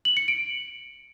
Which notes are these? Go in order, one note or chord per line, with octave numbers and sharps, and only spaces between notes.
F#7
C#7
D7